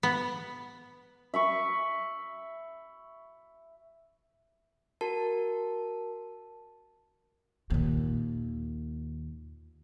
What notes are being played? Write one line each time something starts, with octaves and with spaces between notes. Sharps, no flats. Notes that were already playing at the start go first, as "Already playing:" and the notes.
B3
E5 B5 C#6
F#4 A#4 A5
D#2 A#2